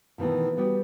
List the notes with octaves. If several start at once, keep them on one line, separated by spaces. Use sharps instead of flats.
B2 D#3 E3 A3 B3
G3 B3 F#4 G4